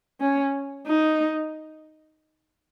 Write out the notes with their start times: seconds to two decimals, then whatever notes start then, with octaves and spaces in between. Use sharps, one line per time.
0.21 C#4
0.86 D#4